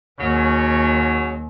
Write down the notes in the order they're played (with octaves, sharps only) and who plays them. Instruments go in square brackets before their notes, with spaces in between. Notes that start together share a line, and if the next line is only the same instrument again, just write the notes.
[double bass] D#2 [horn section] C#3 F#3